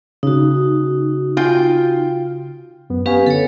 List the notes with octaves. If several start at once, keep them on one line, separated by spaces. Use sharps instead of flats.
C#3 D#4 F#4
F4 G5
F#2 B3
B3 C#4 G4 B4 F5 G#5
D3 A4 C#5